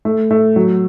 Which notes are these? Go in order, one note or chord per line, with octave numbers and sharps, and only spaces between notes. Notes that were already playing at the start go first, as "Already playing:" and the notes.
A3
A3
F#3